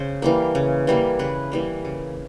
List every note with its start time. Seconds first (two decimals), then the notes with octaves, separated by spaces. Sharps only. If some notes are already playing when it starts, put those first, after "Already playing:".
Already playing: C#3 C5
0.22 E3 G3 A#3
0.55 C#3
0.87 E3 G3 A#3
1.19 C#3 B4
1.52 E3 G3 A#3
1.85 C#3